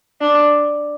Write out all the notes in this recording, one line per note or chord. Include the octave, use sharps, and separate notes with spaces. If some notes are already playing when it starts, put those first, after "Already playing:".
D4